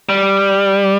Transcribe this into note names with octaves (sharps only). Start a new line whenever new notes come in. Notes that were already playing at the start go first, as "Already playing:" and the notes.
G3